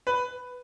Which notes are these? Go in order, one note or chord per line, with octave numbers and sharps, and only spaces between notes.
B4